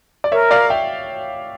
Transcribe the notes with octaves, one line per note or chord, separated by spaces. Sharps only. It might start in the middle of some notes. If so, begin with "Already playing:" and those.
D5
A#4 C#5 E5
D5 F5
E5 G5